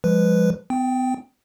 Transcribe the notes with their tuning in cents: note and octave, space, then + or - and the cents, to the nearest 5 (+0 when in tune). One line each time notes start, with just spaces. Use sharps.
F3 +0 G#3 -35 B4 +0
B3 +40 G5 +0